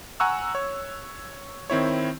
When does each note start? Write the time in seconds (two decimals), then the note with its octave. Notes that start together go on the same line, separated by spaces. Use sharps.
0.20 F#5 G#5 A#5 C#6 E6 F#6
0.55 C#5
1.70 D#3 C4 E4 C#5